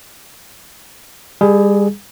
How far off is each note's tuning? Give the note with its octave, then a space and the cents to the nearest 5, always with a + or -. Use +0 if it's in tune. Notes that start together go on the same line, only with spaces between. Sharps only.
G3 +40 G#4 +15